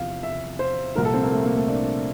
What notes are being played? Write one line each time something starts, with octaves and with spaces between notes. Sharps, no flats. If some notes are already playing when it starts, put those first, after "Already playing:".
Already playing: E2 C3 F3 F5
E5
C5
C2 A#2 F3 A#4
A4
C4
A#3
A3
A#3
A3
D4